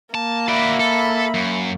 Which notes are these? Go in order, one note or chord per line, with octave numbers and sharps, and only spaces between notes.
A#3 A5
F#4 D5 E5 B5
A4
F#2